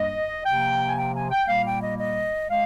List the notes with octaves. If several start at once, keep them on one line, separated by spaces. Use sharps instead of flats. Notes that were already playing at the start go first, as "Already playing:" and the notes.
Already playing: G2 G3 A#3 D#5
C3 F3 A#3 G5
G#5
G5
G#5
G5
A#2 G3 A#3 F5
G5
D#5
D#5
G#3 F5